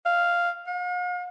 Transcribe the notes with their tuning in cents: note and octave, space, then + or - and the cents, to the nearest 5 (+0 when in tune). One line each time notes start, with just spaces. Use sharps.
F5 -5
F5 +45